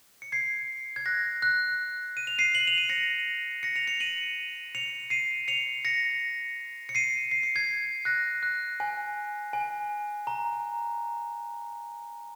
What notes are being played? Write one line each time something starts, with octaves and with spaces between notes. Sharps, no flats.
C#7
G#6 C7
G#6
F#6 A#6
F#6
D#7
F7
C7 D#7
F#7
F7
D#7
A#6 C#7
A#6 C#7
C#7 F7
C#7 F7
D#7 F#7
C#7 F7
C7 D#7
C#7 F7
A#6 C#7
C#7
C7 D#7
C7
C#7
G#6 C7
F#6 A#6
F#6
G#5
G#5
A#5